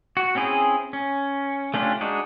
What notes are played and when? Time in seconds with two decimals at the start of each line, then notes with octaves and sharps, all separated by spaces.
0.17 F#4
0.35 C4 C#4 E4 G#4 C5
0.93 C#4
1.74 A3 C#4 D4 F4 G4
2.01 G#3 D4 D#4 F#4